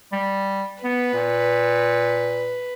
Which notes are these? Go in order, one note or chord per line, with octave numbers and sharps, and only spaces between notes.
G3
B3 B4
A#2